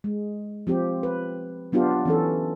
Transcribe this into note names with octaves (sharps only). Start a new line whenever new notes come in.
G#3
F3 C4 G4
B4
F#3 B3 D4 F4 G4
E3 C#4 A4